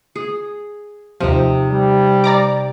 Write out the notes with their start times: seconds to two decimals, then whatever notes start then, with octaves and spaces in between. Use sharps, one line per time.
0.16 G#4
1.20 D#2 C3 F3 D#4
1.69 G3
2.24 D5 A#5 D6